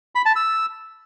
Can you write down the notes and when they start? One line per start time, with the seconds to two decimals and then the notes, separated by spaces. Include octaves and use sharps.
0.15 B5
0.25 A5
0.36 E6